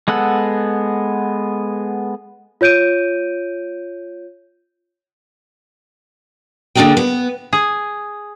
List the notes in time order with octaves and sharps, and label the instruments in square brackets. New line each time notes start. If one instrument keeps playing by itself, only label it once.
[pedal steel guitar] G#3 B3 A4 F#5
[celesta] F4 C#5 G6 D7 D#7
[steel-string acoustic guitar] D3 A#3 D4 D#4 G#4 G5
B3
[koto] G#4